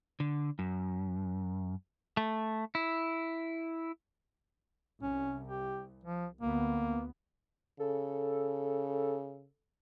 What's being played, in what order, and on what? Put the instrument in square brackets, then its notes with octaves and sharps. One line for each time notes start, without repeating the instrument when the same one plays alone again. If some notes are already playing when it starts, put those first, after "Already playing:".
[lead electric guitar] D3
F#2
[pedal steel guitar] A3
E4
[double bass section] C2 [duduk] C#4
[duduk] G4
F3
[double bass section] D2 B3 [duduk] A#3
[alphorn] C#3 [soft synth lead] A4